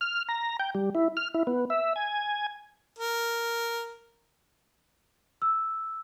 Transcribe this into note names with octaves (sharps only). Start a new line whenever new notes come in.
F6
A#5
G5
G3
E4
F6
E4
B3
E5
G#5
A#4
E6